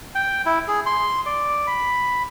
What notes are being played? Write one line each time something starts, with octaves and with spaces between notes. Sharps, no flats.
G5
E4
G#4
C6
D5
B5